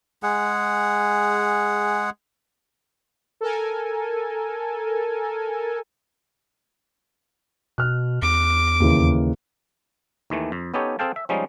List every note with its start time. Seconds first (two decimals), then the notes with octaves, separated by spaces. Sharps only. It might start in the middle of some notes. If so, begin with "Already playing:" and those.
0.23 G#3 G#4 F#5
3.41 A4 A#4 G#5
7.78 B2 F6 F#6
8.22 E2 D6
8.80 D#2 C#3 E3
10.30 D#2 D#3 E3 A3
10.52 F2
10.74 B3 C#4 D#4 G4 A4 C#5
10.99 C4 G#4 A4 F5 G5 A5
11.16 E5
11.29 F3 G3 G#3 C#4 D#4